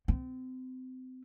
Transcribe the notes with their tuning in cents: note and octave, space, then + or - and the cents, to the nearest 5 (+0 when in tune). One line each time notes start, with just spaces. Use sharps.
C4 -30